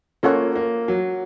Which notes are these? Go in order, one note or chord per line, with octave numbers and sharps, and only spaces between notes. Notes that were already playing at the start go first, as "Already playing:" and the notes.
A#3 C#4 F4 A4 C#5 F#5
A#3
F#3